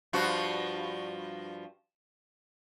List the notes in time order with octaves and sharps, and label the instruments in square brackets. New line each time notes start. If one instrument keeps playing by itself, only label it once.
[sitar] G2 F3 F#4